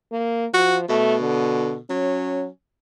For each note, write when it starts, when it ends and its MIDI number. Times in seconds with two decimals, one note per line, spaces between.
0.12 0.46 58
0.54 0.88 53
0.54 0.77 66
0.89 1.79 47
0.89 1.15 57
1.21 1.75 50
1.90 2.48 54
1.90 2.47 61